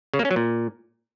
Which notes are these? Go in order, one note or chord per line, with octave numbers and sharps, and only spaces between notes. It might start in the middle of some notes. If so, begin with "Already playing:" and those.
C#3
A#3
C#4
F#3
A#2